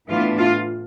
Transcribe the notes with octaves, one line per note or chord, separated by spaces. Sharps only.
A2 E3 B3 D4 F4
F4